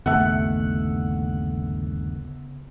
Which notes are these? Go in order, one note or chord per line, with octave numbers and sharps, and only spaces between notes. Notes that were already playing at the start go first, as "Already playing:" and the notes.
G1 D#2 C#3 A3 B3 E5 F#5